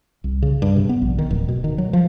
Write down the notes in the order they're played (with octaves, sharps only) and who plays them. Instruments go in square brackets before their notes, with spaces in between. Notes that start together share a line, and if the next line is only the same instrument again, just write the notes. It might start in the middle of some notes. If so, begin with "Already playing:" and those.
[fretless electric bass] C2
C#3
G2
C3
B3
A#1
D#3
D1
B2
D#3
F#3
F3